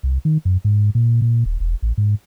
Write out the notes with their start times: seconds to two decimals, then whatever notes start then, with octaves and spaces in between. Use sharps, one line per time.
0.03 C2
0.25 D#3
0.45 F#2
0.65 G#2
0.95 A#2
1.22 A#2
1.45 D#1
1.60 E1
1.82 A1
1.98 G#2